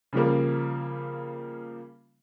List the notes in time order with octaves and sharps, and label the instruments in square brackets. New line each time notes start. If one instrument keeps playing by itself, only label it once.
[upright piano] C#3 F3 G3 A#3